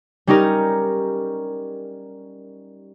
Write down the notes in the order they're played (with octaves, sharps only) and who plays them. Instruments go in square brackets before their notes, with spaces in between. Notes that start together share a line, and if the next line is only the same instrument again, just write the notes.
[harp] G3 C#4 D#4 G4 A#4